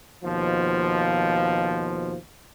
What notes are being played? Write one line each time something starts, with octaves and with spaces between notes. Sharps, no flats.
D#2 B2 F3